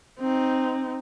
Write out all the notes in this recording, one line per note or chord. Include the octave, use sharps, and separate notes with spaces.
C4 D#4